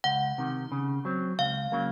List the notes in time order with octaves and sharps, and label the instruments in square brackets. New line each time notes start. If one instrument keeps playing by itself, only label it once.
[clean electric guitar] C#2 [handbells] F#5
[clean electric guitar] C3 D#3
C#3
F#3 C4
[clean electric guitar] C#2 [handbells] F5
[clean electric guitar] C#3 F#3 A#3